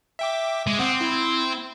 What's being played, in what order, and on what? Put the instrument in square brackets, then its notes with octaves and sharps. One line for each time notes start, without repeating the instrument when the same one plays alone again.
[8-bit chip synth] E5 G5 D6
[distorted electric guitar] G#3 [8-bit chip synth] D6
[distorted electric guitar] C4 [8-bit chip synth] F#5 D6 D#6
[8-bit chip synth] E4